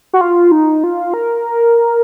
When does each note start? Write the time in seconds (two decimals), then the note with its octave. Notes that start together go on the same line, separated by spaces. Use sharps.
0.13 F#4
0.21 F4
0.52 D#4
0.84 F4
1.14 A#4